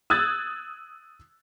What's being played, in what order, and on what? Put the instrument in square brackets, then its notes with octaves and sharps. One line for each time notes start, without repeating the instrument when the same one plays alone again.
[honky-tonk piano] D#6 E6 F#6 G#6 A6